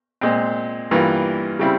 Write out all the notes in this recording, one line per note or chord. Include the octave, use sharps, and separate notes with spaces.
A#2 G#3 C4
G2 E3 A#3 F4
C#3 G3 C4 E4